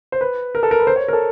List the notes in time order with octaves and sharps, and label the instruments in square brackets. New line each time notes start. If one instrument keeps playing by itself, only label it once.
[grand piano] C5
B4
A#4
A4
A#4
B4
C5
C#5
A#4
A4